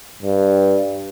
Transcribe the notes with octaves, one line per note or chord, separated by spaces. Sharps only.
G2